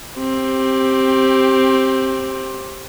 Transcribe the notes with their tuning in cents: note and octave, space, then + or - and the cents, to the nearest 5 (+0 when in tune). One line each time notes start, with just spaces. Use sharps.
C4 +15 G4 +0